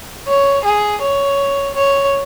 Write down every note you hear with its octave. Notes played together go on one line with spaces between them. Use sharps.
C#5
G#4
C#5
C#5